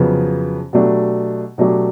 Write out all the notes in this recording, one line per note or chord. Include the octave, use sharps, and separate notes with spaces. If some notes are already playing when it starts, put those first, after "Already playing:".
Already playing: F2 C#3 F#3 B3
B2 F#3 A3 D4 G4
B2 F#3 A3 D4 G4